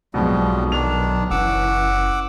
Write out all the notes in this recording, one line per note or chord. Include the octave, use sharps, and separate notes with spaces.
B1 F2 G#2 B2 F3 G3
D#3 D4 F7
F#1 E3 C#4 F#5 D6 E6